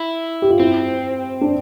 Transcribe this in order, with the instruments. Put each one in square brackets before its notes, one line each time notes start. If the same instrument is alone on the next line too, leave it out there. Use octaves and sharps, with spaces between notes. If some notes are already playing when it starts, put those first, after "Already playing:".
Already playing: [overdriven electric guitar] E4
[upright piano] G4
F4
[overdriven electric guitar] C4 [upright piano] E4
[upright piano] D4